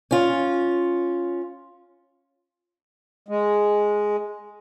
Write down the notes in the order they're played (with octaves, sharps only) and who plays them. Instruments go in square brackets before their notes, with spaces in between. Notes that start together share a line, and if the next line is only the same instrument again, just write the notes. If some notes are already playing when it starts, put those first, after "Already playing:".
[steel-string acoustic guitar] C#4 F4
[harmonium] G#3